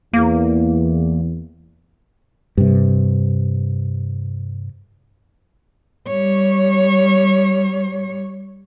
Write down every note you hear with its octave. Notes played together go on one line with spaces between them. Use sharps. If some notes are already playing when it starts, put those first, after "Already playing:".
E2 A#3
G2 C3
G3 C#5